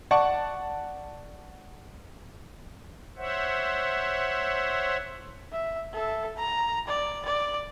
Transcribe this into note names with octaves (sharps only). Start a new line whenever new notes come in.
D5 F#5 A5 C#6
C5 C#5 E5 F#5
E5
A4 E5
A#5
D5
D5